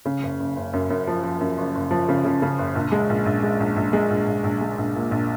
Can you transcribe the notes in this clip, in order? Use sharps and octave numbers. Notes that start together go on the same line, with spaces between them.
C#3
F#1
F#1
F#1
F#2
F#2
F3
F3
F#2
F#1
F#1
F3
C#3
C#3
C#3
F#1
A#1
G#3
A#1
A#1
G#3
A#1
A#1
G#3
A#1
A#1
A#1
G#3
A#1
A#2
A#1